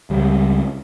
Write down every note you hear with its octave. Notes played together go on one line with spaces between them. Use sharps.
C#2 G3